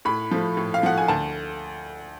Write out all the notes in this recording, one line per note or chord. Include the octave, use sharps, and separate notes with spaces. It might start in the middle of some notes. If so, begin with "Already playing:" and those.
A2 B5
F3 A3
A2
F5
F3 A3 F#5
G#5
D2 A5